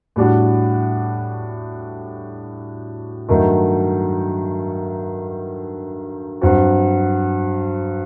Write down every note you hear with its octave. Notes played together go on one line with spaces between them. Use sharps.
A2 G3 D4 F#4
G2 D#3 F#3 A3 D#4
G2 F#3 C4 F#4